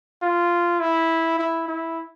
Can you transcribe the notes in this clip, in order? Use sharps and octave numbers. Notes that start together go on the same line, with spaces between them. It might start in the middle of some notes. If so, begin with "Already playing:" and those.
F4
E4
E4
E4